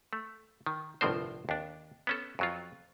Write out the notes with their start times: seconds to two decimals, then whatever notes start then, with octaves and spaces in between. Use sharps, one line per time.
0.13 A3
0.66 D#3
1.01 G1 C2 A2 F3 C4 C5
1.49 D#2 D4
2.07 B3 C#4 A4
2.39 F2 F#3 F4